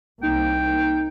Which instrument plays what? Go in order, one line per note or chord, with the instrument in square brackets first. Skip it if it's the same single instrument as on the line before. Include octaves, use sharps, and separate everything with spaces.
[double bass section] C2 A#3 [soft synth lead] D#4 [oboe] G5